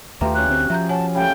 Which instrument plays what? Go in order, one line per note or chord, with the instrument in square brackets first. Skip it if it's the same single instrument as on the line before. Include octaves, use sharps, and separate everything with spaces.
[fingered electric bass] D#2 A3 [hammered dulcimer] F4 G4 [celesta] B4 E5 A#5
[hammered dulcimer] F#3 C#4 [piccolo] F#6
[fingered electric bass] D2 C4
[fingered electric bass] F3 [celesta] E5 A#5 G6
[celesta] C#5 F#5 G#5 [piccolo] A5
[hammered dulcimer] C#3 G3 A3 [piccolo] G5